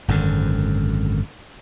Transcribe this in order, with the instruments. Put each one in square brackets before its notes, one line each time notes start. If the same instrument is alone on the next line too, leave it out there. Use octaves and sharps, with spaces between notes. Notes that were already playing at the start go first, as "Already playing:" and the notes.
[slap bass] G#1 F#2 D3